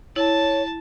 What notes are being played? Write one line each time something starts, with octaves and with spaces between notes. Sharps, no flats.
E4 C#5 A5